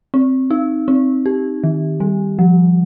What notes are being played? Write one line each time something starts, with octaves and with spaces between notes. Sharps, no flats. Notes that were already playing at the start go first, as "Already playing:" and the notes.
C4
D#4
C4
G4
D#3
G3
F3